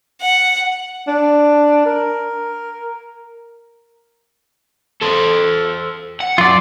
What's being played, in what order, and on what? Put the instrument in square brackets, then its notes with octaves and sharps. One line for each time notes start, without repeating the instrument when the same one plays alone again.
[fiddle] F#5
[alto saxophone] D4
A#4
[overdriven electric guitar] A4 C5
F#5
[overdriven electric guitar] F#2 [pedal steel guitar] F4 D5